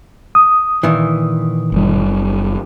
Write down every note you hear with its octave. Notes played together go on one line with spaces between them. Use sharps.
D#6
A#2 D#3 E3
F#1 G3